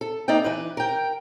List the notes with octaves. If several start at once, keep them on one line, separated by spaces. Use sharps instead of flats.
A4
A#3 D#4 A4 D5 G5
E3 B4
A#4 G5